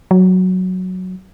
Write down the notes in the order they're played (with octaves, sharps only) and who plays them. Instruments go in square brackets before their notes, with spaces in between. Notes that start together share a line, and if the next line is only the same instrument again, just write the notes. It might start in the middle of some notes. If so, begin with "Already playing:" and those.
[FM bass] F#3